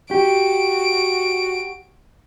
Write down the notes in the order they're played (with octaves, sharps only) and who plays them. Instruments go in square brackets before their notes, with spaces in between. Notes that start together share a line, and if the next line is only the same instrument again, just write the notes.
[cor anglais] F#4 [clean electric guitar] G4 [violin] D7